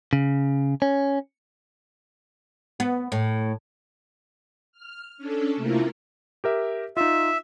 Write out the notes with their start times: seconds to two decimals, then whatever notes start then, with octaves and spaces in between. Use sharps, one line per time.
0.13 C#3
0.82 C#4
2.80 B3
3.12 A2
4.72 F6
5.18 C#4 D4 A4
5.56 C3 A3 A#3 E4 F4 A#4
6.44 G4 A#4 E5
6.97 D#4 F4 E5